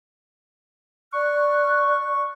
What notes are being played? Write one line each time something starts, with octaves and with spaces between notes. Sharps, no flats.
D5 C#6 F6 F#6